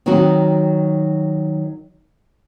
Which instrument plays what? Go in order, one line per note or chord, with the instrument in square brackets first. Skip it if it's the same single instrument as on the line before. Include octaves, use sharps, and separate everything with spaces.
[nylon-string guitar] D#3 F#3 C4 D#4 F#4